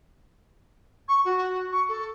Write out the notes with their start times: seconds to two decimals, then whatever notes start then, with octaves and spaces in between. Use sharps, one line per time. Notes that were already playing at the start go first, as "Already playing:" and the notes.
1.08 C#6
1.25 F#4
1.71 C#6
1.88 A4